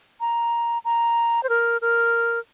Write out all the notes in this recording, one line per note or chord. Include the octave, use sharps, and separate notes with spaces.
A#5
A#5
C5
A#4
A#4